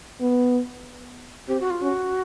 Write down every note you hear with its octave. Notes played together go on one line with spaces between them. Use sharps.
B3
C4 G4
F#4
F4
C#4 F#4